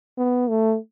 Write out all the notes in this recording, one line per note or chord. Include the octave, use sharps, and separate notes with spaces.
B3
A3